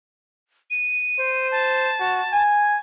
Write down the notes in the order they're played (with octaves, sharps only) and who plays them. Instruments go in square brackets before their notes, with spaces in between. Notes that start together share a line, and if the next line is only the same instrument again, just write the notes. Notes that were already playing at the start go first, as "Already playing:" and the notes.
[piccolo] D#7
[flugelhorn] C5
[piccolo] A5
[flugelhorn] F#4
G#5